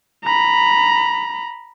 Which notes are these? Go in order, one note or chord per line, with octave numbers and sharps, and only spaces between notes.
A#5 B5